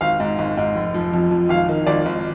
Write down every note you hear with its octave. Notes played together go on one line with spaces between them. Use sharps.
G#1 F5
G#2
G#1
G#2
F1
F3
F2
F2
G#1 F5
D#3
G#1 D5
G#1